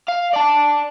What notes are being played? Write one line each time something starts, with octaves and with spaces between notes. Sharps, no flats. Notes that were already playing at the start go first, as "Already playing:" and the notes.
F5
D5 A5